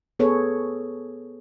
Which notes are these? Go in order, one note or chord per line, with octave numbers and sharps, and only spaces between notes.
B3 G#4 A4 B4 C#5